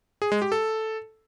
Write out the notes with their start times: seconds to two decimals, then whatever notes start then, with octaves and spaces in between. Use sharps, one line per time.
0.22 G#4
0.32 G#3
0.42 G4
0.52 A4